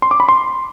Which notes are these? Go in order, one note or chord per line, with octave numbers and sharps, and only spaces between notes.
C6
D6
B5
C6